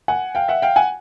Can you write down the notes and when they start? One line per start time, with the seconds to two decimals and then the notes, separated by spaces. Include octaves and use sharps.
0.08 F#5 G#5
0.35 F5 G5
0.48 E5 F#5
0.62 F5 G5
0.76 F#5 G#5